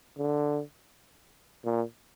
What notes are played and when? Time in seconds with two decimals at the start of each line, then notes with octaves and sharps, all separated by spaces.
0.18 D3
1.65 A#2